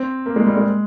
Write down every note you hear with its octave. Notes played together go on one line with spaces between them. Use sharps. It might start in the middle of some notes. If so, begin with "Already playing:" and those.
Already playing: C4
A#3
G#3
G3
G#3